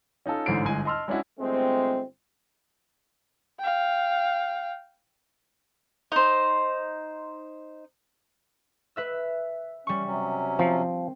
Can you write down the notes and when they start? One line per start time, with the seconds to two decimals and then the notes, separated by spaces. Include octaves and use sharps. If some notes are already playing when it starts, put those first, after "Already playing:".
0.26 C#4 D#4 F4 A4
0.46 A1 G#2 D3 C5 C7 D7
0.65 G1 G#3 G#5
0.85 D#5 A5 C6 E6 F6
1.08 G#3 C#4 D4 E4 F#4
1.38 G1 G#3 A3 C4
3.59 F5 G5
6.12 D#4 C5
8.96 B4 E5 E6
9.87 G3 C#4 C#6
10.06 C3 F#3 C#4
10.59 F3 C4